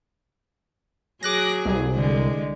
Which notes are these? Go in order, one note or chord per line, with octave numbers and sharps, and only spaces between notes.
F#3 G#4 D6 F#6 A#6
C2
D3 G#3